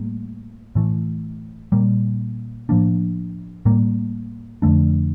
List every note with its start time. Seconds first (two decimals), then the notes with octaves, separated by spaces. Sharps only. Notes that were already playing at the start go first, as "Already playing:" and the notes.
Already playing: A2 G3 A#3
0.75 A2 E3 A3
1.72 A#2 G3 A#3
2.69 A2 F3 A#3 D4
3.65 A2 G3 A#3
4.62 F2 D3 A3 D4